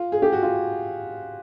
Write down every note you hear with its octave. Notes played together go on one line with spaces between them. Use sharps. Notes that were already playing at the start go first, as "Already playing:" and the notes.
Already playing: F4
G#4
G4
F#4
F4